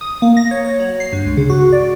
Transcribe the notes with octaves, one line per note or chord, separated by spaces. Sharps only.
D#6
A#3
A#6
C#5
C#5
F#3
C7
G2
C#2
C#3
F#4
D5